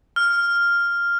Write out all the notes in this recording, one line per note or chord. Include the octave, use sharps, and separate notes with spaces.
F6